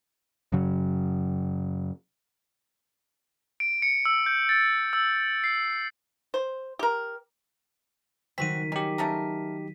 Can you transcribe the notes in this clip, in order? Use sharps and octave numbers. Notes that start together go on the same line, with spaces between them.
F#2 C#3 F#3
D7
C#7
E6
G6
A6
E6
C7
C5
G4 A#4
D#3 F#3 G3 C4 F#4 B6 D#7
C#4 D#4 G4 A#6 C#7
A3 C#4 A#4